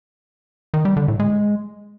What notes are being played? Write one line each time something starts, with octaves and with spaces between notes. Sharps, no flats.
D#3
G3
D3
A2
G#3